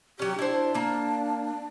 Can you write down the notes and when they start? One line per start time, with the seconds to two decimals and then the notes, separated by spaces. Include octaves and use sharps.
0.19 F#3 C#4 G4
0.39 D4 E4 C5
0.74 A#3 A5